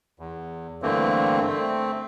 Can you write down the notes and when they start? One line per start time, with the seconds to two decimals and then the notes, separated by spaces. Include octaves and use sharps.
0.19 E2
0.82 G2 D3 E3 A3 A#3 C4
1.48 A3 C4